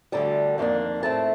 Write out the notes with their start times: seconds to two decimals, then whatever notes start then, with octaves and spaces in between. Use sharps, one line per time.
0.12 D2 D3 G3 A5
0.58 F2 D#3 A#3 D4
1.03 A2 A3 C4 A5